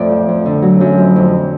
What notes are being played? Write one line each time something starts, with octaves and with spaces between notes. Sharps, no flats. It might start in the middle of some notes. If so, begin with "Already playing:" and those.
Already playing: F2 A2 D5
F3
F2
D3
F#3
F#2
F2
F2